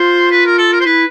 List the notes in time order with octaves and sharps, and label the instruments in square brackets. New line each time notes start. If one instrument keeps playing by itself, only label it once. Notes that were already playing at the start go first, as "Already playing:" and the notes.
Already playing: [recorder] F4 [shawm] C5
[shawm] B4
A#4
A4
A#4
C5
[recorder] E4 [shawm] B4